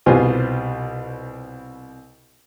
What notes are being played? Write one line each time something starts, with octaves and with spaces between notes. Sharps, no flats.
C2 B2 F4 G4 C5 G#5